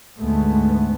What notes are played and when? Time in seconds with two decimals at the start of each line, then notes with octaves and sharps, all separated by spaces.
0.17 D2 G#2 G#3 A3 B3